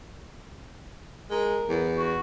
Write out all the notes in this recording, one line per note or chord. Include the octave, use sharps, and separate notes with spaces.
G#3 A#4
E2
F#4